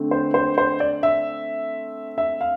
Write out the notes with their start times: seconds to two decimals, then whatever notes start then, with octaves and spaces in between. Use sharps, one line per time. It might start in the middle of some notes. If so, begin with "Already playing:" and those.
Already playing: D3 A3 C4
0.11 C5
0.34 C5
0.58 C5
0.80 D5
1.03 E5
2.18 E5
2.41 F5